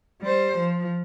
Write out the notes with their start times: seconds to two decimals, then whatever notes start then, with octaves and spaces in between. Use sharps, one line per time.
0.22 G3 C5
0.58 F3